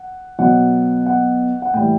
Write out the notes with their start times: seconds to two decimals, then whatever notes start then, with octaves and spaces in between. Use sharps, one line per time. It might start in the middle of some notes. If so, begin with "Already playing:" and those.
Already playing: F#5
0.39 B2 F#3 F#5
1.06 F#5
1.62 F#5
1.74 A2 E3 G3 G5